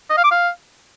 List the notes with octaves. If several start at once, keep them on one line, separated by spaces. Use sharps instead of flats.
D#5
F5
D6
F5